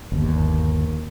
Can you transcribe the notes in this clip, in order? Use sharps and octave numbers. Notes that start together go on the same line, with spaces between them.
G1 D#2